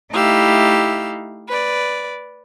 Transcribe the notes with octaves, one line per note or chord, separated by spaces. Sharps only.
A3 D#4 E4 G4 F5 E6
B4 D5